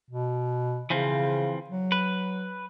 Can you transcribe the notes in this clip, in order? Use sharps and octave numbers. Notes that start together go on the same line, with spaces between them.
B2
C#3 E3 F3 C4
F#3
B4